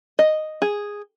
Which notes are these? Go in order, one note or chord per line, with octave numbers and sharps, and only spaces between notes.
D#5
G#4